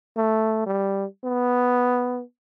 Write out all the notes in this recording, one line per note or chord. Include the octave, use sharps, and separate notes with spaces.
A3
G3
B3